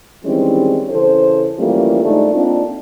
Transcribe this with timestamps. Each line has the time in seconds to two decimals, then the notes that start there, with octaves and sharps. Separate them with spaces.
0.25 D#3 E3 G3 G#3 C4 C#4
0.90 C#3 E3 A4 C5
1.59 E3 F3 G3 A3 A#3 C#4
2.03 G#2 D3 A3 D#4 E4 D5
2.34 A#3 C4 D4 D#4 F4